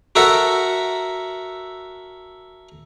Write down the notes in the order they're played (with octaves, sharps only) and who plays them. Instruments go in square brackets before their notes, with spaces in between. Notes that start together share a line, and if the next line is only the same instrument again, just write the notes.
[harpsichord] F#4 A4 A#4 E5 F#5